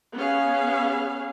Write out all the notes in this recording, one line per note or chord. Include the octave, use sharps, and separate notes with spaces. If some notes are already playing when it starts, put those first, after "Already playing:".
B3 C#4 G#4 F5